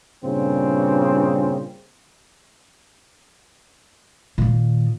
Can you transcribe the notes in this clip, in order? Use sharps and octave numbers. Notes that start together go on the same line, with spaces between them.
G2 A#2 C#3 C4
A#2 D#3